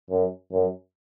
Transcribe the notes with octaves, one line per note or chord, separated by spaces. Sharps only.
F#2
F#2